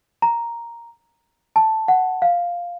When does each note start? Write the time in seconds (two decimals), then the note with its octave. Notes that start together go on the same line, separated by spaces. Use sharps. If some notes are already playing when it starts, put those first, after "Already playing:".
0.22 A#5
1.56 A5
1.88 F#5
2.22 F5